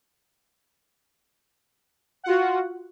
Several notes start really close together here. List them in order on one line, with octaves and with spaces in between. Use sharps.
F#5 F4 F#4